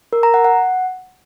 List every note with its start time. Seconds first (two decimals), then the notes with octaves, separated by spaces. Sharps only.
0.13 A#4
0.23 A#5
0.34 F#5
0.45 F#5